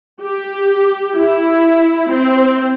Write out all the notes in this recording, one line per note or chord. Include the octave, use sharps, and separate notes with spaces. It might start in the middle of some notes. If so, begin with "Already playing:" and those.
G4
E4
C4